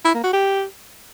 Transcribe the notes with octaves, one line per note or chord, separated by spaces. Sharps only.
E4
A#3
F#4
G4